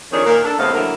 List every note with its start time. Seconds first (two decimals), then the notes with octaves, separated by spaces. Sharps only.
0.12 F2 D#3 D4 G#4 C#5
0.26 A#2 D#3 A#3 A#4
0.45 D4 A4
0.59 E2 A2 C3 C4 D#5 F5
0.74 D3 F#3 A#3 E4 A#4